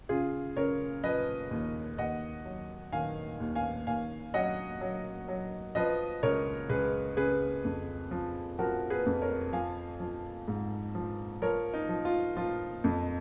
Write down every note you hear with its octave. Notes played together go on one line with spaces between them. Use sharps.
C#3 F4 G#4
C#3 A#4 C#5
F3 B4 D#5
D#2
D#2 D#5 F#5
F#3
D#3 F5 G#5
D#2
F5 G#5
D#2 F5 G#5
F#3 D#5 F#5
F#3
F#3
F3 B4 D#5
C#2 A#4 C#5
C#2 G#4 B4
C#3 G#4 B4
F2
F3
F3 F#4 A#4
G#4 B4
F2
A#4 C#5
F3 F5 G#5
F3
G#2
F3
F3 A#4 C#5
D#4
F3
F4
F3 F4
F2